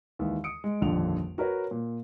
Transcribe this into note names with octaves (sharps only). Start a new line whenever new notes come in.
D#2 E3 G#3
D#6 C#7 D7
G#3
D#1 A#1 F2 D3 F7
F#4 A#4 B4 C#5
A#2